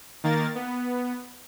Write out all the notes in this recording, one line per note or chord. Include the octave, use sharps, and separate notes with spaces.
D#3 A#3 A#4 A6
B3